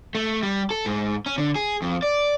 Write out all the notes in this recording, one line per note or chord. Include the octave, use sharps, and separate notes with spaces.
A3
G3
A4
G#2
C#4
D3
G#4
F2
D5